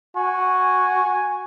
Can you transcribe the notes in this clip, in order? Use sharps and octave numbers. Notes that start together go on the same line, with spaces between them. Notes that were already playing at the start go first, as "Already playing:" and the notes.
F#4 G#5